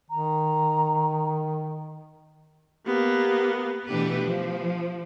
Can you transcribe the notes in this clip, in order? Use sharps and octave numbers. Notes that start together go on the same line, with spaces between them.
D#3 A#5
A#3 B3 G4
B2 E3 A3 D4 G4 B4
F3